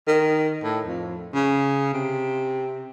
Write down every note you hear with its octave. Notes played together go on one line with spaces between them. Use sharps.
D#3
A2
F2
C#3
C3